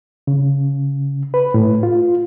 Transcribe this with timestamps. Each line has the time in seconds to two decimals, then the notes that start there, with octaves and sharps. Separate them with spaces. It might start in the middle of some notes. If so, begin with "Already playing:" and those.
0.27 C#3
1.34 B4
1.54 A2
1.83 F4